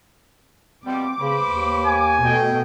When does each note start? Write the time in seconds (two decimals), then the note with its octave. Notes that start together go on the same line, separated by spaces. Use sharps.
0.86 B2 F3 G3 C4 D6
1.20 C#3 B4 C5 B5
1.48 D#2
1.87 G#5
2.24 B2 A3 A4 D#5 G5